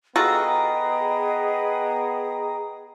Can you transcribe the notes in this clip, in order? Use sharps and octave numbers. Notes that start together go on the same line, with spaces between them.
B3 F4 F#4 G#4 A4 D#5 G5 A#5